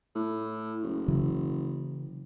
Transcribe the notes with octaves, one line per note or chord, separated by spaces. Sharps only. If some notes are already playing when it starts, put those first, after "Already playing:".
A2
F#1
C#3 E3 F#3